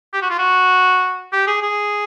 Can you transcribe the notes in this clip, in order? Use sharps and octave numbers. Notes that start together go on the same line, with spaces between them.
G4
F#4
F4
F#4
G4
G#4
G#4